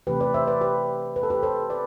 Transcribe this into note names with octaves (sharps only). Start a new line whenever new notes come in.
C3 E3 A3 G4 B4
B4 D5
C5 E5
B4 D5
G4 B4
B4
A4
G4 B4
A4 C5
B4 D5